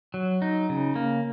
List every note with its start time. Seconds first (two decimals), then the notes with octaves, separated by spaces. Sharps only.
0.14 F#3
0.42 D#4
0.69 C#3
0.96 A#3